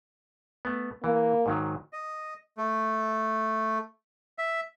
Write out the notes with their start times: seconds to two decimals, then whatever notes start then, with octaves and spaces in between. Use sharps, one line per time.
0.65 A3 B3
1.04 E3 A#3
1.46 G#2 D#3 F#3
1.93 D#5
2.57 A3
4.38 E5